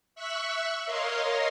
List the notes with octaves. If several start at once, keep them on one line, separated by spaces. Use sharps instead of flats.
E5 C#6 E6 F#6
A#4 C#5 D#5 F5 C6